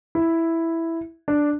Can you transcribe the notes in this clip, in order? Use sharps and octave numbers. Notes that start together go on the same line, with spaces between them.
E4
D4